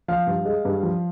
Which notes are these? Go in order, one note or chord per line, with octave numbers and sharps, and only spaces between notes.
F3 F5
G2
G#3
G2
F3